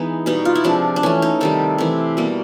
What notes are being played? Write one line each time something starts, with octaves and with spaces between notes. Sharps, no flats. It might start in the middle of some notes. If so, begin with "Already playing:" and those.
Already playing: E3 G#3 B3 D#4
B2 G3 B3 D#4
F4
E4
C3 F3 G#3 D4
D4
E3 A3 C#4
D#4
C3 D#3 G3 A4
C3 E3 A3
B2 G3 A#3